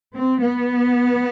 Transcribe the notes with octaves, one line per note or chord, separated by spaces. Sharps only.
C4
B3